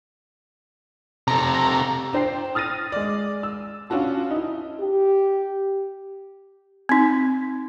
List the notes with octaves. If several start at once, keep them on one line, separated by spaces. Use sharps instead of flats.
C3 A4 A#5
D4 C5 G5 C7
D#6 F6 A6 A#6 D#7
G#3 D5
E6
C#4 D4 F4 F#4 A5
D#4 E4
G4
C4 D#4